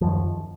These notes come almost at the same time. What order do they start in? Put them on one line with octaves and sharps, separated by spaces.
F3 F#2 D#3